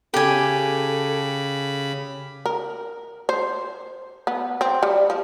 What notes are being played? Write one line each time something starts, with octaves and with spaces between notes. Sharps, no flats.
C#3 G4 A4 G#5 B5
A#4
C5
B3
C4
G3
F3